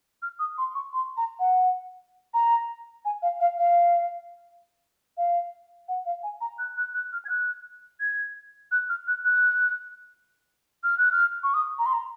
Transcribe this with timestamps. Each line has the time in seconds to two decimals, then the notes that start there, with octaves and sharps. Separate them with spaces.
0.22 F6
0.39 D#6
0.58 C6
0.75 C#6
0.93 C6
1.17 A#5
1.39 F#5
2.34 A#5
3.05 G#5
3.22 F5
3.40 F5
3.58 F5
5.17 F5
5.88 F#5
6.05 F5
6.23 G#5
6.41 A#5
6.58 F#6
6.77 F#6
6.94 F#6
7.13 F6
7.25 G#6
7.29 F#6
8.00 G#6
8.71 F#6
8.89 F6
9.07 F#6
9.24 F#6
10.84 F6
10.98 F#6
11.12 F6
11.43 C#6
11.54 D#6
11.79 A#5
11.86 C6
11.93 A#5